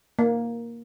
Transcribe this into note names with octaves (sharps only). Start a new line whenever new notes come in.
A#3